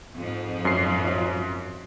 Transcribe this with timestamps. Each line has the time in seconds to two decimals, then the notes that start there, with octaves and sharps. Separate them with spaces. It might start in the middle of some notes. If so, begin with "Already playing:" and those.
0.18 F2 G#2 F3
0.65 F#2 C7